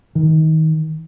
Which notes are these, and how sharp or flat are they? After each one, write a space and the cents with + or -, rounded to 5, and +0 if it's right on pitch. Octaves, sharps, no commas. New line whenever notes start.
D#3 +25